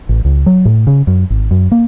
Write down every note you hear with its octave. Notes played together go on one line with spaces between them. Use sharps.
A1
C#2
F#3
A2
C#3
F#2
G#1
F#2
A#3